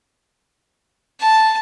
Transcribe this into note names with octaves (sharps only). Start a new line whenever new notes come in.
A5